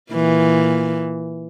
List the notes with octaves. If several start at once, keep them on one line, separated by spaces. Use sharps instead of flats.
A#2 E3